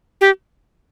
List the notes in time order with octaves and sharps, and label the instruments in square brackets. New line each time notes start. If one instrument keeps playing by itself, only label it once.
[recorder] G4